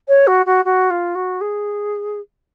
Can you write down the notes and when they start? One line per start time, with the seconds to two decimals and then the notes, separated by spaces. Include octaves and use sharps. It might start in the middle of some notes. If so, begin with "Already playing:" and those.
0.08 C#5
0.27 F#4
0.46 F#4
0.65 F#4
0.90 F4
1.15 F#4
1.41 G#4